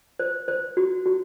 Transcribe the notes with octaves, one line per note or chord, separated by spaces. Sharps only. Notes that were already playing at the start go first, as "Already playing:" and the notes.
C5
C5
F#4
F#4